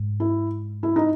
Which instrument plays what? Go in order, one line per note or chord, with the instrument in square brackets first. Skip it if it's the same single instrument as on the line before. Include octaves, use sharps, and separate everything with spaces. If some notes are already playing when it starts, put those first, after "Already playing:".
Already playing: [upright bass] G#2
[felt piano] E4
E4
D#4